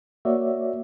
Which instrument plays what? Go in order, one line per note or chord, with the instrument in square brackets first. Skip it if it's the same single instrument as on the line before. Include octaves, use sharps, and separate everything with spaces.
[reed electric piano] A#3 F#4 C#5 D5 E5